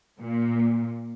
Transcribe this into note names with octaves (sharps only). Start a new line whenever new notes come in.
A#2